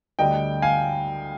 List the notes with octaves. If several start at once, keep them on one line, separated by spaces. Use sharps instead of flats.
D2 D3 G3 D#5 G5
F5 G#5